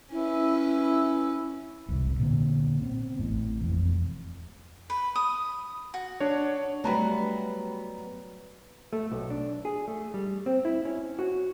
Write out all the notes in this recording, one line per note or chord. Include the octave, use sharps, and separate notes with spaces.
C#4 E4 B4
E1 C2
A#2 D3 B3
B3 C4
A1 A2
E1 F2
B4
D#6
F#4
D4 C#5
F#3 G3 A3 B3 A#5 B5
A3
B1
D4
G#4
A3
G3
C4
E4
C#4
F#4